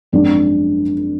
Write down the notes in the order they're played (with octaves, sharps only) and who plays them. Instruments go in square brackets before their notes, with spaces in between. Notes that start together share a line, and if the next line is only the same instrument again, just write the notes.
[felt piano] G#1 F#2 F3 G#3 D4